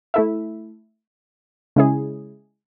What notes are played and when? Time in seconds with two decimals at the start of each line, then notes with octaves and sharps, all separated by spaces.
0.14 A3 E4 A4 E5
1.76 C#3 G#3 C#4 E4 G#4